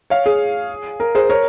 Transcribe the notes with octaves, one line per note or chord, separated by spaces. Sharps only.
C#5 F5
G#4
A#4
G#4 C5
A#4 C#5